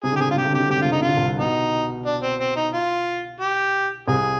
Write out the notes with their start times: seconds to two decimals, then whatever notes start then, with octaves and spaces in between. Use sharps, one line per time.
0.04 C3 G#4
0.12 D3
0.16 G4
0.20 C3 G#4
0.28 D3 F4
0.36 C3 G4
0.44 D3
0.52 C3 G4
0.60 D3
0.69 C3 G4
0.77 D3
0.81 C3 F4
0.92 D3 D#4
1.01 C3 F4
1.08 D3
1.17 C2 C3
1.38 B2 D#4
2.06 D4
2.23 C4
2.40 C4
2.56 D#4
2.73 F4
3.40 G4
4.08 C2 C3 G#4